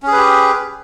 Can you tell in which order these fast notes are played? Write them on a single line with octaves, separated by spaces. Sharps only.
C#4 G#4 B4 G4